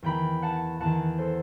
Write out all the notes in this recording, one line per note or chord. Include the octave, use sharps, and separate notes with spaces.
E2 D#3 G5 B5
F#5 A5
E2 D#3 F#5 A5
A4 C5